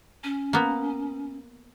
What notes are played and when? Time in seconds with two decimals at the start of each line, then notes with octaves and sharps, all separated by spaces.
0.23 C#4
0.53 A#3 B3